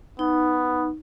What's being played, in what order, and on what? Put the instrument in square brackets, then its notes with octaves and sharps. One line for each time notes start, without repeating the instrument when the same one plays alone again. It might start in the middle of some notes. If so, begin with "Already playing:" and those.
[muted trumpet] B3 [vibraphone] D#4